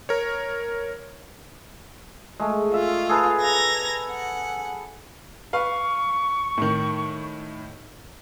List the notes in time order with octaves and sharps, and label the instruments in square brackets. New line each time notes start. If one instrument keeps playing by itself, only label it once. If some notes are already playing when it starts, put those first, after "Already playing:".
[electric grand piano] A#4 C#5
[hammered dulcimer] G#3 A3
[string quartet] F4 [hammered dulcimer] E5
[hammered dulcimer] G#4 A4 B4
[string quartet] A#5 G#6 A#6
F#5
[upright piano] B4 F5 [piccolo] C#6
[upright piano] A2 D#3